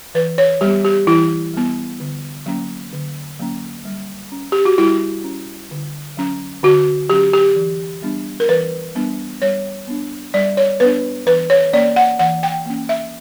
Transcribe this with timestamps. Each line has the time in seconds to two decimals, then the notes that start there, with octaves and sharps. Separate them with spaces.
0.15 E3 B4
0.38 C#5
0.61 G3 B3 G4
0.85 G4
1.07 E3 E4
1.54 G3 B3
2.00 D3
2.46 F#3 A#3 C#4
2.93 D3
3.39 F#3 A#3 C#4
3.85 G3
4.32 C#4
4.52 G4
4.65 F#4
4.78 G3 E4
5.24 C#4
5.71 D3
6.17 F#3 C#4
6.63 D3 F#4
7.10 F#3 C#4 G4
7.33 G4
7.56 E3
8.02 G3 B3 D4
8.40 A#4
8.49 E3 B4
8.96 G3 B3 D4
9.42 G3 C#5
9.88 B3 D4
10.34 G3 D5
10.57 C#5
10.80 B3 D4 B4
11.26 E3 B4
11.50 C#5
11.73 A#3 C#4 D5
11.96 F#5
12.19 E3 F#5
12.43 G5
12.66 A#3 C#4
12.89 E5